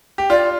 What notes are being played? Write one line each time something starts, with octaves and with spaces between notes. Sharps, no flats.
G4
F4 D5